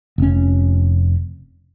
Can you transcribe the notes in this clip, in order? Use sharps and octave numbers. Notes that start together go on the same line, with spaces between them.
F1 C#4